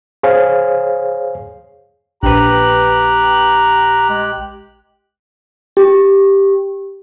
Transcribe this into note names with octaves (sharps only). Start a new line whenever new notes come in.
G#4 C5 C#5 F5 G#5
A#1 G4 B4 A#5 F#6
G#3
G4